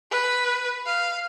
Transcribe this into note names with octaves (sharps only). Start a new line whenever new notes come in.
B4
F5